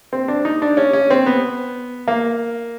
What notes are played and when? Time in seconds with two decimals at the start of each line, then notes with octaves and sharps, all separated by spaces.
0.13 C4
0.28 D4
0.45 D#4
0.62 D4
0.77 C#4
0.93 C#4
1.10 C4
1.26 B3
2.08 A#3